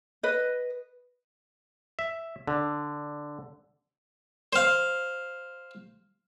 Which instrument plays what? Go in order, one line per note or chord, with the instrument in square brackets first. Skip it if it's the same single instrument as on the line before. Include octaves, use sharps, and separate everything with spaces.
[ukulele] B4 D#5
[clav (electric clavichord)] E5
D3
[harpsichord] C5 F5